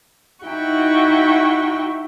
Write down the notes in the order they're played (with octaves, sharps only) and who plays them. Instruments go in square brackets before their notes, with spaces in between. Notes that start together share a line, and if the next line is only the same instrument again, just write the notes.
[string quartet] D#4 E4 F#4 G5 C#6